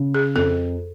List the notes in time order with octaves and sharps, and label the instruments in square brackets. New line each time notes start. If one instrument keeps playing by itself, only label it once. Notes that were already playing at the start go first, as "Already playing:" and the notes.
Already playing: [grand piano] C#3
[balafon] G#4
[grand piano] F2 [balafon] A4